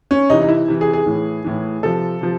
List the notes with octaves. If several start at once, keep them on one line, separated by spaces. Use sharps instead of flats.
C#4
C3 E3 D#4
D#4
E4
C3 E3
G#4
G#4
A2 E3
A2 E3
C3 F3 A4
C3 F3